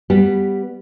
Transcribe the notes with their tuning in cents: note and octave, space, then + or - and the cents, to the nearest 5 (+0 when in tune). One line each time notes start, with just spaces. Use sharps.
G3 +0 B3 +0 G4 +0